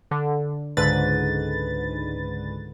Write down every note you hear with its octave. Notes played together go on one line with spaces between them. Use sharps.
D3
C#2 G#2 D3 B4 A6